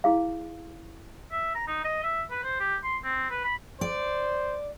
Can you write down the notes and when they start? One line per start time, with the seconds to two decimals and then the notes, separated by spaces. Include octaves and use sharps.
0.04 E4 G#4 F5
1.31 E5
1.55 A#5
1.67 D#4
1.84 D#5
2.03 E5
2.30 B4
2.43 C5
2.60 G4
2.84 C6
3.04 C4
3.30 B4
3.44 B5
3.81 C5 D5